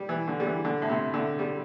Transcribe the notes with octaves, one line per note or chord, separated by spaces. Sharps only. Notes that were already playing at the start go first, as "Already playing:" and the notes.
Already playing: G3
E3
D3
G3
E3
D3
A2
C3
D3
G3